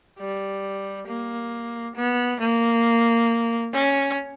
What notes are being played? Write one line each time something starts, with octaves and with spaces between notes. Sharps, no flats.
G3
A#3
B3
A#3
C#4